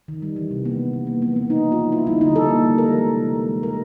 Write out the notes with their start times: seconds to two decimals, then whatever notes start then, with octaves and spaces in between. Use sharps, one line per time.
0.08 D#3
0.22 G3
0.36 E3
0.51 C3
0.65 A#3 B3
0.79 G3
0.93 E3
1.07 A#3
1.21 F3 B3
1.35 C#3 B3
1.50 C#3 D#4
1.65 A#3
1.72 F4
1.78 F3
1.92 A#3 E4
2.07 G3 D#4
2.21 D3 D#4
2.36 D3 A4
2.49 A#3
2.64 G3
2.78 G#3 A#4
2.92 E3
3.06 C3
3.21 C3
3.35 G#3
3.49 E3
3.63 A#3 A#4